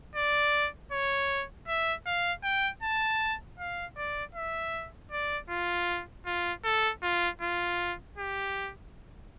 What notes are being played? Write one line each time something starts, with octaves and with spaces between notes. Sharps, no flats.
D5
C#5
E5
F5
G5
A5
F5
D5
E5
D5
F4
F4
A4
F4
F4
G4